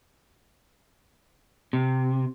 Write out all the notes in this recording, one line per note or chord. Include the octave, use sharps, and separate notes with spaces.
C3